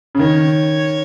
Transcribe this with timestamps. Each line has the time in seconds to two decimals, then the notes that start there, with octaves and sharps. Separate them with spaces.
0.15 C#3
0.19 D#3 C#5